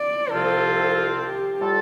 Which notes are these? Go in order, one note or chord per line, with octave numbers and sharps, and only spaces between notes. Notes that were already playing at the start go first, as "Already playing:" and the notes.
Already playing: D5
C2 C3 F3 C4 F4 A4
A4
G4
A2 G3 F4 A4